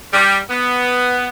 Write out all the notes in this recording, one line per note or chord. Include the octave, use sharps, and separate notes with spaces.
G3
B3